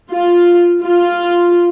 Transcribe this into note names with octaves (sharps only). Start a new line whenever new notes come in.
F4
F4